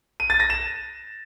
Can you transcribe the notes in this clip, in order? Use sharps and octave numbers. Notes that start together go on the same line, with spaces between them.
D#7
A6
A#6
E7